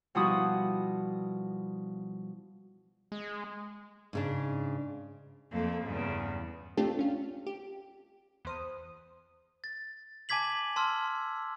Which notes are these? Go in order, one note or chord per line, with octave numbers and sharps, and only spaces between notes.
B2 F3 G3 E4 F#4 D#6
G#3
G#2 C#3 D4
F2 A3 A#3
E2 G2 C#3
A3 C4 D4 F4 G4 A4
C#4 F4
G4
E2 C5 D#6
A6
G#5 A5 D6 G#6 B6 F#7
A5 C6 E6 F6